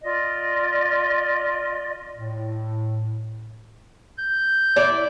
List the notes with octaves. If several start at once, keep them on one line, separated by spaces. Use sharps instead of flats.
F4 D5 D#5
A2
G6
E4 D5